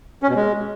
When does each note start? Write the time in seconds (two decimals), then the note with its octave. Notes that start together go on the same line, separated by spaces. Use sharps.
0.23 C#4
0.29 B2
0.36 G#3